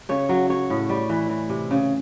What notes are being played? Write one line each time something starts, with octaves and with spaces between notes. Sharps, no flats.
C#3 C#5
F#3
F#3 C#5
A2
G3
E3
E3
C3
C#3